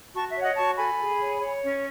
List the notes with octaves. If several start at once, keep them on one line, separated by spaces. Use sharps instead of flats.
F#4 A5 C#6
C#5 E5
D#5 F#5
F#4 A5 C#6
A4 G#5 B5
G#4
C#5
C#5
C#4